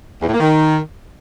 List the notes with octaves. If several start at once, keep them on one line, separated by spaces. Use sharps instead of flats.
E2
A2
A#3
D#3